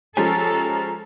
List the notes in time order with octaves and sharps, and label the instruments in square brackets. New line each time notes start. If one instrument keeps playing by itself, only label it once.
[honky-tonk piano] F3 G#3 C#4 [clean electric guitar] F4 G4 G#5 [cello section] A4 [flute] A#5